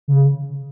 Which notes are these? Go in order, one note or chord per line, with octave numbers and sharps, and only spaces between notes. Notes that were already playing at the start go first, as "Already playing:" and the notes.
C#3